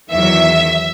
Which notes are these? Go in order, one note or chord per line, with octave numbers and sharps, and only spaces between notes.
E2 D#3 F#3 E5